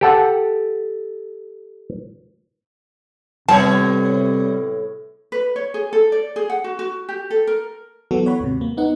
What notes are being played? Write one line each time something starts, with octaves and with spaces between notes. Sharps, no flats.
G4 A4 F#5
A2 C3 G3 B3 C#5 A5
B4
C#5
G#4
A4
D5
G#4
F#5
F#4
F#4
G4
A4
A#4
E3 F#3 B3 F#4 A4
C#5 F#5 B5
D#2 G#2 C3
A#3
B3 D#4 F#5